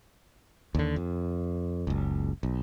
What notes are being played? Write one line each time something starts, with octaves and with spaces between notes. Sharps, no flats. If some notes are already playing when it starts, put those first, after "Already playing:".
D#2 D3
F2
F#1 C#2
B1